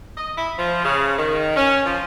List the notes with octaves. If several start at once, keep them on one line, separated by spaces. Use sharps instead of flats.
D#5
E4
F3
C#3
D#3
C#4
F3